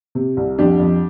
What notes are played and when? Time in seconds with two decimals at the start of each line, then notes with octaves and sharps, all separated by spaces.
0.15 C3
0.37 C2
0.59 F2 D4 G4
0.80 F2